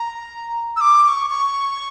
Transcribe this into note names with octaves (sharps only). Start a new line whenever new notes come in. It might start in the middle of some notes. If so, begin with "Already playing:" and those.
Already playing: A#5
E6
D6
D6
C#6
C#6